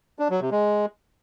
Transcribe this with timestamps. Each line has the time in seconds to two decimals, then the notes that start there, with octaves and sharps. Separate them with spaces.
0.19 D4
0.30 F#3
0.41 C3
0.51 G#3